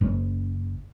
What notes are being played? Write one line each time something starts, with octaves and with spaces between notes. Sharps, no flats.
F#1